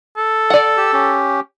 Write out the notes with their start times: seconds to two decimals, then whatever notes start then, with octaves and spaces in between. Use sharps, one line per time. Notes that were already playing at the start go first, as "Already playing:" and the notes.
0.17 A4
0.50 D5 F#5
0.77 G4 E6
0.93 C#4 G4